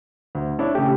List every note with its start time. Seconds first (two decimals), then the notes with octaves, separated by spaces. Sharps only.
0.35 D2
0.59 D4 E4 C#5
0.75 C#3 A3 G4